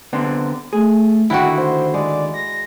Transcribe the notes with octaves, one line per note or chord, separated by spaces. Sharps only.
D3 B3 C4
A3 G#4
D#2 D3 E4 F#4 F#5 G5
C5
G#3 D5
A#6